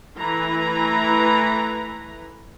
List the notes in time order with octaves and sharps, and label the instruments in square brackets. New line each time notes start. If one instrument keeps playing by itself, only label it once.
[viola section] E3 A3 E4 B4 A#5